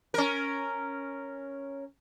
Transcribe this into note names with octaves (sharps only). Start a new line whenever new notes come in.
C#4 A#4